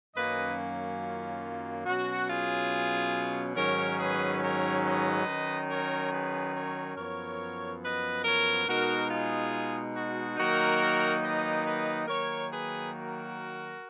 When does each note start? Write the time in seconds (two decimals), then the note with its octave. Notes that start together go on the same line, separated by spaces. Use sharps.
0.15 F#2 D#3 F#3 A#3 C#4 B4 D#5
1.01 F4
1.86 B2 F#3 C#4 F#4
2.28 F4 G#4
3.56 G#2 D#3 F#3 C#4 A#4 C#5
3.99 G#4 B4
4.41 A#4 C#5
4.84 B4 D#5
5.26 D#3 F#3 C#4
5.69 A#4 C#5
6.11 G#4 B4
6.54 A#4 C#5
6.97 F#2 F3 B3 A#4 C#5
7.82 B4 D#5
8.24 A#4 C#5
8.67 B2 G#3 D#4 F#4 A#4
9.09 F4 G#4
9.95 F#4
10.37 D#3 F#3 A#3 D#4 F#4 A#4
11.23 B4 D#5
11.65 B4 D#5
12.08 D#3 F#3 A#3 A#4 C#5
12.50 G#4 B4
12.93 F#4 A#4